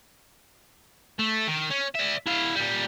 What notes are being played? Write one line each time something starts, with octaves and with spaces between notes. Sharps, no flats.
A3
D#3
C#4
D5 E5
E4 F5
A#2 G3